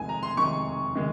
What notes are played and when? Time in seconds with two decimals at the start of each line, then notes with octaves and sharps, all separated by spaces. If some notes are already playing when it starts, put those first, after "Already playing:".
Already playing: F1 F2 D#3 G#3 G#5
0.09 A#5
0.23 C6
0.37 F1 F2 D#3 G#3 C#6
0.95 D#3 G#3